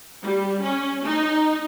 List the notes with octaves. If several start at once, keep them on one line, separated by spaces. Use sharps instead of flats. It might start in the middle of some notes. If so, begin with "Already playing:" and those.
G3
C#4
D#4